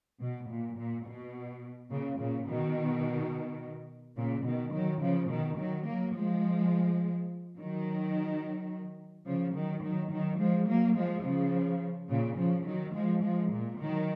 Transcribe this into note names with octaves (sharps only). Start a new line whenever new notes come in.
B2
A#2
A#2
B2
A#2 C#3
A#2 C#3
B2 D#3
A#2 C#3
B2 D#3
D#3 F#3
C#3 F3
B2 D#3
D#3 F#3
F#3 A#3
F3 G#3
D#3 F#3
C#3 F3
D#3 F#3
D#3 F#3
D#3 F#3
F3 G#3
F#3 A#3
F3 G#3
C#3 F3
A#2 C#3
C#3 F3
D#3 F#3
F3 G#3
F3 G#3
A#2
D#3 F#3